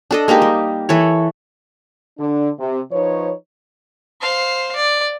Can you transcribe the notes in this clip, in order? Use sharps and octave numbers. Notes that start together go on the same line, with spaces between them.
D4 A4 D#5
G#3 A#3 D#4 G4
G3
E3 A4 C#5
D3 D4
C3
F3 D#4 B4 C#5
C5 F5
D5